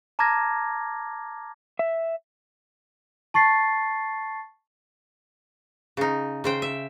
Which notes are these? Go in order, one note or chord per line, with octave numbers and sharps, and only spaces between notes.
A5 A#5 D6 F6 G#6 A#6
E5
A5 C#6 A6 C7
C#3 D#4
C#3 C5 G5
E5